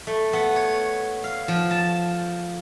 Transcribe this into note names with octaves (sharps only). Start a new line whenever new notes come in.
A3
B3
C#5
F5
F3
A5